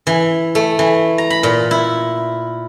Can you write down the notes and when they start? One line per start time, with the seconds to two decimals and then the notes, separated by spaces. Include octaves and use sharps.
0.07 E3
0.55 A3
0.79 E3
1.18 A#5
1.30 B5
1.43 A#2
1.71 E4